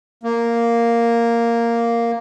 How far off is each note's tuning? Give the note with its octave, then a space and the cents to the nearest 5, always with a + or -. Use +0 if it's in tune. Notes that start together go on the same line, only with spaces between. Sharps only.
A#3 +0